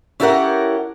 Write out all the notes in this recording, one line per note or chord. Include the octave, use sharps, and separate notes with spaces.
C#4 E4 G4 A4 A#4 F#5